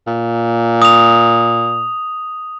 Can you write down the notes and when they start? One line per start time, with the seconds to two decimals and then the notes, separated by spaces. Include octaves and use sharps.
0.07 A#2
0.82 D#6 F7